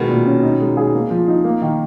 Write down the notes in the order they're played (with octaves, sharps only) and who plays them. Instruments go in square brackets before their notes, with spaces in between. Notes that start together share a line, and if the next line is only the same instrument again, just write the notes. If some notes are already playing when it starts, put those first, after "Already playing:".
Already playing: [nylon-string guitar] B2 D#3 [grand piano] G#3
[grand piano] A#2
C#4
D#4
G#3
G#4
A#3
F3
D#4
A#3
D#3